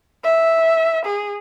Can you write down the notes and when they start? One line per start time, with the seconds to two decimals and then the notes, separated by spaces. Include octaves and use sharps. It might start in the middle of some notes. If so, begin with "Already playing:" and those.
0.24 E5
1.06 G#4